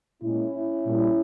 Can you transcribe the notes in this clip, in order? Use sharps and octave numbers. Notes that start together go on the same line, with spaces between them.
A#2 G#3 C#4 E4
A#2 G3